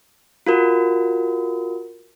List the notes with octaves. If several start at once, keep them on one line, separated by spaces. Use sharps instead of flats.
F4 F#4 A#4